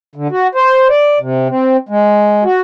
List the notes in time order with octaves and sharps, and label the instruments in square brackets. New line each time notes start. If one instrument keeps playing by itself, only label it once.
[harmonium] D3
F#4
C5
D5
C3
C4
G#3
F#4